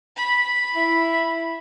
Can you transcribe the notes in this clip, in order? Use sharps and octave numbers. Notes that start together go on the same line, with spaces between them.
B5
E4